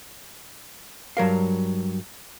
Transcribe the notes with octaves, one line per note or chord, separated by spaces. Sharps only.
G2 F#3 A#4 F5